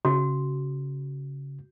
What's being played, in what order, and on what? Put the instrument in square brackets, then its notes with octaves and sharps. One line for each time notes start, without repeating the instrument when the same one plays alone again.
[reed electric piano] C#3 [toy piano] F#4